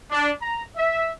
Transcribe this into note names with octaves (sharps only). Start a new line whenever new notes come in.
D4
A#5
E5